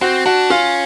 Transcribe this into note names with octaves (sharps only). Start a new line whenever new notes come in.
C4 F#4
D4 F#4
C#4 F4